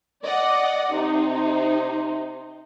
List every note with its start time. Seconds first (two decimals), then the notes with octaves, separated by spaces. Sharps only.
0.23 D5 D#5 F#5
0.93 C3 D#4